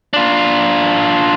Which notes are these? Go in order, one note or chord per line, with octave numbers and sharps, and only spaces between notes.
D4 F4